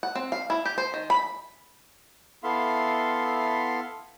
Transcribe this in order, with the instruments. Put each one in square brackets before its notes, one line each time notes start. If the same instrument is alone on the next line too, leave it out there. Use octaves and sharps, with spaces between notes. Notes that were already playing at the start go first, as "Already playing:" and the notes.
[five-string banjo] F#5
C4
F5
E4
G4
C5
D#3
B5
[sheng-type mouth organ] B3 E4 A4 E5 F5 C6